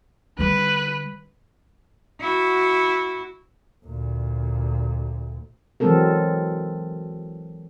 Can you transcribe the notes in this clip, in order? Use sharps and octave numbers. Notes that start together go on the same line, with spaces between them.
D3 G3 B4
E4 F#4
D2 A#2
E3 F#3 G#3 C4 A4 A#4